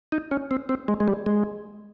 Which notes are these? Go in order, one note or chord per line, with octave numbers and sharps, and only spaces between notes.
D#4
C#4
C4
C4
G#3
G#3
G3
G#3